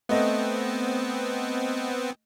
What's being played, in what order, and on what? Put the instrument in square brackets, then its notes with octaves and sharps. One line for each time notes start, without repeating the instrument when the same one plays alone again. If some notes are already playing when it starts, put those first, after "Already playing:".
[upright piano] A3 D#5 [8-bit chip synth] B3 C4